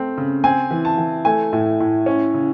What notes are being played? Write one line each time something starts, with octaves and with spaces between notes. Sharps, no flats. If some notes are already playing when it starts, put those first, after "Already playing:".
Already playing: A3 C4
C#3
C4 G#5
E3
A5
E3
A3 G#5
A2
A2
C#4
C#3